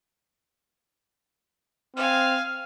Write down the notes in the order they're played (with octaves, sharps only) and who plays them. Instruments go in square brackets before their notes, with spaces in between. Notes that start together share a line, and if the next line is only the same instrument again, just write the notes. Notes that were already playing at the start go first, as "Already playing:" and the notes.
[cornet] C4 [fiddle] F5 G#5 [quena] F6